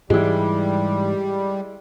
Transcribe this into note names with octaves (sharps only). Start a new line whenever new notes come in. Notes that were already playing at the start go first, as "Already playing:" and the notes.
G#2 E3 G3 G#3 E4